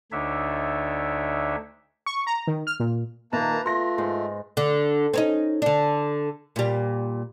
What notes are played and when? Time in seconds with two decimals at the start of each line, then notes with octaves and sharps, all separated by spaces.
0.12 D2 D3 D4 D#4 C#5 E5
2.06 C#6
2.27 A#5
2.47 D#3
2.67 F6
2.80 A#2
3.33 A#1 D#3 A#3 B4 A5 A#5
3.66 A3 F4 C6 A#6
3.98 G#2
4.57 D3
5.14 C4 C#4 D#4
5.62 D3 D4
6.56 A#2 G3